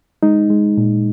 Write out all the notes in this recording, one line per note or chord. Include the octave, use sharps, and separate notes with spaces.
G#3 D#4
G#3
A#2